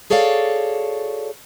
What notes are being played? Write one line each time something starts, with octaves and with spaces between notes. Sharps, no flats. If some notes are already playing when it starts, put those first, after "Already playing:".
F#4 G#4 A4 C#5 D5 F5